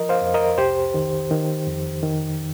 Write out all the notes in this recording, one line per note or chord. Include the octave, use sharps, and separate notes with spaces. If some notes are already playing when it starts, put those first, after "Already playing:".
Already playing: F3 A#4 D#5
C5 F5
F2
A#4 D#5
C2 G4 C5
D#3
D#3
F2
D#3